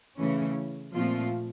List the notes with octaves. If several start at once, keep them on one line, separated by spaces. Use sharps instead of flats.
C#3 E3 A3 C#4
A#2 F3 A3 C4 F4